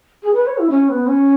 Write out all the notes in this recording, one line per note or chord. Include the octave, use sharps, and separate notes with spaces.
G#4
B4
C#5
E4
C#4
B3
C#4